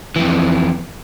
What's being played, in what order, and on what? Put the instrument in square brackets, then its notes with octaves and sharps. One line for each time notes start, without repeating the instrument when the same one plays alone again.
[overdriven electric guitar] F2 E3